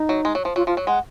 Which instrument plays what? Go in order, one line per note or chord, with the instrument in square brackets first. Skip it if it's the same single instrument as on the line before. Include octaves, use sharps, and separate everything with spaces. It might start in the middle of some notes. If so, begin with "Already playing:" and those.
Already playing: [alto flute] D#4
[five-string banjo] F#3
G#3
F#3
F3
[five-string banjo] F#3 [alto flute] F4
[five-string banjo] F3 [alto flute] F4
[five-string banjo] F#3
[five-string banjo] G#3 [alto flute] F#5